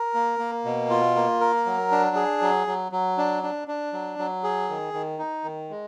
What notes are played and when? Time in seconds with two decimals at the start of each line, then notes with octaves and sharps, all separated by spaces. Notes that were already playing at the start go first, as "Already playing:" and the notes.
Already playing: A#4
0.14 A#3
0.39 A#3
0.65 B2
0.90 F4
1.16 A#3
1.40 A#4
1.66 F#3
1.91 D4
2.16 G#4
2.42 F#3
2.67 F#3
2.92 F#3
3.18 D4
3.43 D4
3.68 D4
3.93 F#3
4.19 F#3
4.44 G#4
4.69 D#3
4.94 D#3
5.19 D#4
5.44 D#3
5.70 G#3